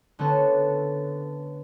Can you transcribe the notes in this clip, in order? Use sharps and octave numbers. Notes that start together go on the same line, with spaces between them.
D3 A3 B3 C#4 A4